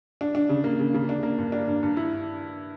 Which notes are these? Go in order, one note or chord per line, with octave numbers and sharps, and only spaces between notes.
D4
D4
C#3
A#3
C#3
C#3
D4
A#3
G2
D4
G2
G2
E4